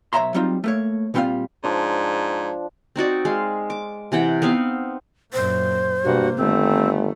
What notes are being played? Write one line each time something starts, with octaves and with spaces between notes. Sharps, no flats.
B1 C#5 D#5 E5 A#5 C6
F#3 G3 C4 D#4 F4
A3 A#3 C#5
A#2 D3 G3 C4 F4 F5
G#2 F3 D4
C4 D#4 F#4 D5
G#3 F5
D6
C3 E3 F#5 G5
B3 C4 D#4 F5
F#2 A#2 C5
G2 B2 A#3 F#4
G1 D#3 A3 C4